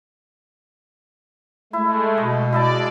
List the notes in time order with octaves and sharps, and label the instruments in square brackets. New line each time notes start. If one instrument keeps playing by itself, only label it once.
[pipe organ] G#3 A3 [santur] E4
[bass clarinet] B2 [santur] D#5
[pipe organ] G#3 D5 [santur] E4 D#5 A5